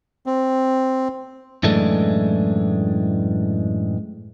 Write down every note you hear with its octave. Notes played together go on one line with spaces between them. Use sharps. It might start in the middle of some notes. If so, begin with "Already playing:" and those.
C4
F#2 A2 E3 G#3 A3 D4